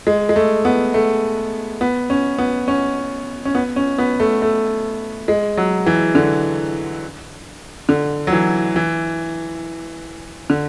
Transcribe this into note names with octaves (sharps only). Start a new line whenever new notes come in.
G#3
G#3
A3
B3
A3
B3
C#4
B3
C#4
C#4
B3
C#4
B3
A3
A3
G#3
F#3
E3
D3
D3
F#3
E3
E3
D3